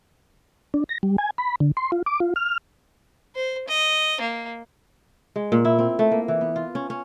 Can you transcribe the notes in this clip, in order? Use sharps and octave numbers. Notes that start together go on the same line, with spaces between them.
D4
A#6
G3
G#5
B5
D3
C6
F4
D6
F4
F6
C5
D#5
A#3
G#3
A#2
E4
C4
A3
A#3
E3
B3
F4
C#4
C#4